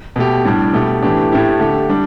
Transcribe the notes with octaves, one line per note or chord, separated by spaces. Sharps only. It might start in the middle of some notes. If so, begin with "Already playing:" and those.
B2 A3 G4
A2 G3 D4
B2 A3 G4
A2 E3 A3 D4 G4
A2 A3 E4 G4
D3 A3 G4
G3 D4